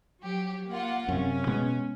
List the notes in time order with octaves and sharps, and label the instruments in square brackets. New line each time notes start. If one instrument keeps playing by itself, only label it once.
[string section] F#3 G4
A#3 F4 F#5
[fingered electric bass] F#2 C3 [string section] C#4
[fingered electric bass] B2 G#3 B3